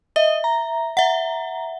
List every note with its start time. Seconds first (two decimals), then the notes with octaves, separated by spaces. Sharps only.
0.16 D#5 E5
0.44 A#5
0.97 E5 F#5